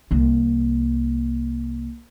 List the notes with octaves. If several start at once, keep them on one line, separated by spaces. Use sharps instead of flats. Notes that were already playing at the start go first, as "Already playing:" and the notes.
C2 A#3